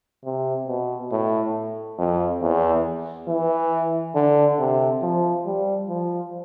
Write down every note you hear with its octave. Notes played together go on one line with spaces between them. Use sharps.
C3
B2
A2
F2
E2
E3
D3
C3
F3
G3
F3